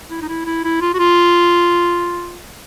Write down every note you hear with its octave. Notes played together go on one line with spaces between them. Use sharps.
E4
D#4
E4
E4
E4
F4
F#4
F4